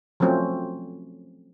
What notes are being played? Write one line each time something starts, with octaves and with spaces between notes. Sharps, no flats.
F3 F#3 A3 C4 C#4